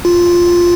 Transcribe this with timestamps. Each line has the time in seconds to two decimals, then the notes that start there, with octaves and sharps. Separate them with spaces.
0.05 F4